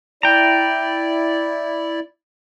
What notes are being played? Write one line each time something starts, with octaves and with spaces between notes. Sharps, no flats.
E4 D5 G5 A#5